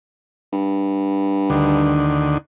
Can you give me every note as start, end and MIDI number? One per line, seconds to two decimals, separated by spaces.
0.53 2.20 43
1.50 2.38 38
1.50 2.38 50
1.50 2.38 51